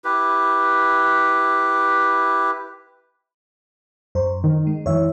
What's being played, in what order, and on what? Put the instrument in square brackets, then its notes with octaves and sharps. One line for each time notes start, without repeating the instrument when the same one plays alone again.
[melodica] E4 G4 B4
[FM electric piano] F#2 C5
[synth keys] D#3
[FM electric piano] G#3
[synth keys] F#2 E3 [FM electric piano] C#5 E5